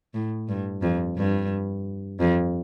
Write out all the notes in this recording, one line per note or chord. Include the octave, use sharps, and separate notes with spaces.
A2
G2
F2
G2
F2